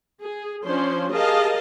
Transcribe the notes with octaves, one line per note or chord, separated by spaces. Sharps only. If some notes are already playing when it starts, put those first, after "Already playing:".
G#4
F3 C#4 D4 C5 C6
G4 G#4 A#4 D#5 F5 A5